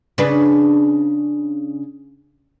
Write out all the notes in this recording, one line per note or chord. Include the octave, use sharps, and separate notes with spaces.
C#3 D4 B4